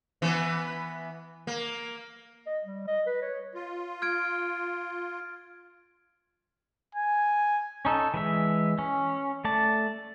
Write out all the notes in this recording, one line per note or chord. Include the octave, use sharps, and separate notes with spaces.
E3 B3
A#3
D#5
G3
D#5
B4
C#5
F4
F6 G#6 D7
G#5
C#4 D#4 A4
E3 G#3 E5
C#4
A3 D5 A5